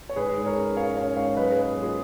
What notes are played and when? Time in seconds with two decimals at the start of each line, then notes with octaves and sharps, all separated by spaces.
0.09 C#5
0.16 G#2 G#4 B4
0.37 G#2
0.46 A#4 C#5
0.57 C#4
0.77 C#4 C#5 F5
0.96 C#4 C#5 F5
1.17 G#2 C#5 F5
1.37 F#3 B4 D#5
1.52 G#4 B4
1.57 A#3
1.77 F#3 F4 G#4